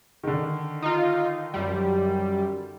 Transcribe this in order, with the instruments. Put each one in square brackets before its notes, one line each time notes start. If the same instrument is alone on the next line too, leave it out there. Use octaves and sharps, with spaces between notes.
[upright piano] D3 D#3
[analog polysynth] D#4 F4
F#2 G3